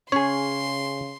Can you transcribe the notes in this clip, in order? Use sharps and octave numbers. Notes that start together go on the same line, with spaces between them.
C#3 C#4 G#4 C#5 C6